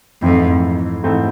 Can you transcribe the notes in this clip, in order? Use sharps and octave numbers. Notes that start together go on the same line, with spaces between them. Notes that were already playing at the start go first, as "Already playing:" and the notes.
F2 G#2 E3 A3 C4 E4
G#2 E3 A3 C4 E4